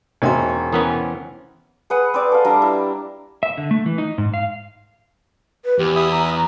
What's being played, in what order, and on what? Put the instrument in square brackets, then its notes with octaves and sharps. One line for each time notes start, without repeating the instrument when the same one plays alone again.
[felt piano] E1 E5 [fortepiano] C#4 D#4 F#4 [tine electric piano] C5 G5 C6
[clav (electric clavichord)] E3 B3 C#4 [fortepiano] A#4 D#6
[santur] G#4 B4 F#5
C4 B4 D5
A4 F5
G3 D4 A#5
E4
[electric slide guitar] E5
D3
A3
E3
D#4
G#2
F5
[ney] B4
[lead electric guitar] E2 [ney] G4
[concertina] E5 B5 D#6
[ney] A#5